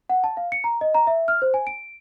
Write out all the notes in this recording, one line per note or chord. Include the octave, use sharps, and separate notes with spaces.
F#5
A5
F5
C#7
A#5
D#5
A#5
E5
F6
C5
G#5
D7